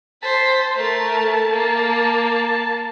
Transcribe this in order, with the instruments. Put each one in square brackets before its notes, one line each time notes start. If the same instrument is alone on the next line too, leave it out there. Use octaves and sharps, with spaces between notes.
[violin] C5 B6 [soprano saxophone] A5
[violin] A3 A#4
A#3